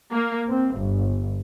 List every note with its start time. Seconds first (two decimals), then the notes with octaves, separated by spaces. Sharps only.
0.14 A#3
0.50 C4
0.80 G1